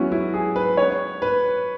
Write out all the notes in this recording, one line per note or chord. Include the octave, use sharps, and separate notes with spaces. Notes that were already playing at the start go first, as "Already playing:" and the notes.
Already playing: F#3 G#3 B3 C#4 E4 F#4
E4
G#4
B4
C#5
B4